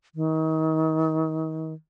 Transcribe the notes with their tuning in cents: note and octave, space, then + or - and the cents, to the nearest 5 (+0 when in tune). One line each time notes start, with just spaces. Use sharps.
D#3 +35